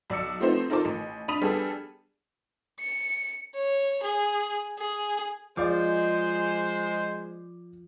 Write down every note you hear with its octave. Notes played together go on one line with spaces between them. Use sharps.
B1 D5 E6 C#7
F3 A3 B3 C4 D#4 C5
D#4 F4 A4 A#4 C5 D6
A1
D4 B5 D#6 D#7 F7
G3 B3 D4 G#4 A4
C#7
C#5
G#4
G#4
F3 G#3 C5 D5 F5 D6